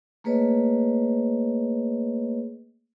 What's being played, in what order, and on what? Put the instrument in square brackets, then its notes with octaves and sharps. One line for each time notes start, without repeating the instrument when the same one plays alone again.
[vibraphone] A3 A#3 G#4 B4 C#5 D#5